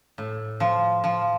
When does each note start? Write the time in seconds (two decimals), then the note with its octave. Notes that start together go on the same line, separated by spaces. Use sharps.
0.18 A2
0.60 F3
1.04 F3